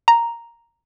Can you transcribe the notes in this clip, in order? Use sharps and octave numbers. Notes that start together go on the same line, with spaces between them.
A#5